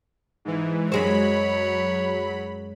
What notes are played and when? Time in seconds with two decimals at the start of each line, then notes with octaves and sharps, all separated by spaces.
0.45 G#2 E3
0.92 F#2 F#3 G#3 C5 C#5 B5